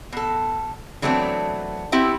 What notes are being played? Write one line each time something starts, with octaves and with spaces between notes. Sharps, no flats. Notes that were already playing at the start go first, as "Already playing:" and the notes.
B2 A4
E3 F#3 A3 B3 C4 D4
B3 C4 E4 G4